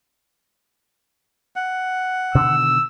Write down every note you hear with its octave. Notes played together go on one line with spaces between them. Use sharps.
F#5
B2 D3 D#3 E6